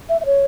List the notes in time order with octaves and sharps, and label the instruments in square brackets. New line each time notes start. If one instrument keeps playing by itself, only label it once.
[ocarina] E5
E5
C#5